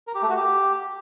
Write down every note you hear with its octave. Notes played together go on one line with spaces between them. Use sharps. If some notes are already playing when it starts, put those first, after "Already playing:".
A#4
G4
A3
F#4
G4